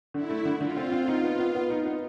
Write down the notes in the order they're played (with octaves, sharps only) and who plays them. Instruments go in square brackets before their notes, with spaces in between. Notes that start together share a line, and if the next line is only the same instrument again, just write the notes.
[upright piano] D3 [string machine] E4
[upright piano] A3
D3
[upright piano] D3 [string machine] F4
[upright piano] C4
C4
D#4
B3
B3
B3
D#4
B3